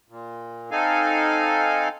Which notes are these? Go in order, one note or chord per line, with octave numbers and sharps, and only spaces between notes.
A#2
C4 D#4 A4 F5 G#5